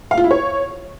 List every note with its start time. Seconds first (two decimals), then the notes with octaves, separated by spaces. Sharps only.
0.11 F5
0.18 F4
0.24 E4
0.31 C#5